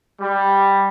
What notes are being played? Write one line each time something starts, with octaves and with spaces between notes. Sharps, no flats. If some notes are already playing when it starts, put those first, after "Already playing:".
G3